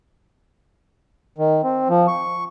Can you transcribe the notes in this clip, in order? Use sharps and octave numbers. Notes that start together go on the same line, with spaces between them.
D#3
C4
F3
C#6